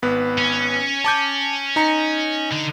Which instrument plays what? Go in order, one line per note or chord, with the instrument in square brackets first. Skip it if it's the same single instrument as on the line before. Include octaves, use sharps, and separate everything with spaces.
[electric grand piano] G#1 B3 B4
[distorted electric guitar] C#4
[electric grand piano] A5 D6 G6
D#4 A#5 C#7
[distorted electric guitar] D3